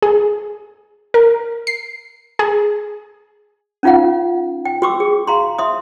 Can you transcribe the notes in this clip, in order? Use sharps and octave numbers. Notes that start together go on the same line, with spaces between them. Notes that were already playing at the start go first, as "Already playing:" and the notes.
G#4
A#4
C7
G#4
C#4 D#4 F4 F5 F#5
G5
F#4 G5 C#6 D6 E6
G#4
F5 A#5 C6
E5 C6 D#6